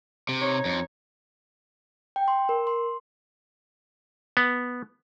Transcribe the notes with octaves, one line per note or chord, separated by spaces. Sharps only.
C3
D#4 C#5
F2
G5
C6
A#4
C6
B3